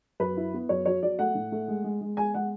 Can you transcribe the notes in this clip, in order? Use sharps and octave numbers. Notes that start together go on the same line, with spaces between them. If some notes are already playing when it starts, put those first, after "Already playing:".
F#2 B4
E4
B3
F#2 C#5
F#3 C#5
F#3 D5
A3 F#5
A2
A3
G#3
G#3
G#3
G#3 G#5
G#3 F#5